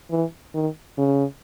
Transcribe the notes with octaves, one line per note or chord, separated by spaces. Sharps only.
E3
D#3
C#3